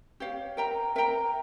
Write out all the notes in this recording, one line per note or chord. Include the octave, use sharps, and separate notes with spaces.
G4 C#5 F5
A#4 E5 G5 A#5
A#4 E5 G5 A#5